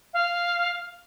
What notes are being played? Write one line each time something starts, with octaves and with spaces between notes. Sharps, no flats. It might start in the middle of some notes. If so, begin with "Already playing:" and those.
F5